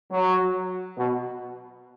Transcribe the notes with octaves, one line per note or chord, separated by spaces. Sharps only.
F#3
B2